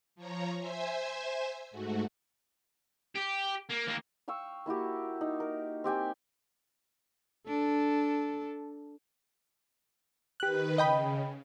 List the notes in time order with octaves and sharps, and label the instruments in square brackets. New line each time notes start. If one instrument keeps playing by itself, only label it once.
[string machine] F3 C#5 A#5
C5 E5 G#5 E6
G#2 A3 F#4
[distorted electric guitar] G4
A#3
D#2 A#3
[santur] F5 G5 C#6 E6
A#3 E4 F#4 G4
D#4
A#4
C4 G4 G5 G#5
[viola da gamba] D4 A4
[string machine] D#3 B4 [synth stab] G4 F#6
[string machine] C#3 [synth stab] D#5 G5 B5